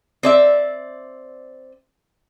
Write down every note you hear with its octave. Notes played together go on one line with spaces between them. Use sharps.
C4 D5 E5